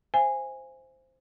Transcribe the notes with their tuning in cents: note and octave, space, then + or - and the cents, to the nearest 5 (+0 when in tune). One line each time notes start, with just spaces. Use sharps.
C5 +0 E5 +40 G#5 -10